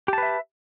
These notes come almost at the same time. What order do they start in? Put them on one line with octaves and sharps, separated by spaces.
G4 A5 B4 E5